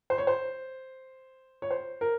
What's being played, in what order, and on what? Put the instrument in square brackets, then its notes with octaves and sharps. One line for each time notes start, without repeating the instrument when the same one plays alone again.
[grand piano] C5
C#5
C5
C#5
C5
A#4